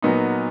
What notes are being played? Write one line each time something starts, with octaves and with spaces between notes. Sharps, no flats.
A#2 F#3 B3 D#4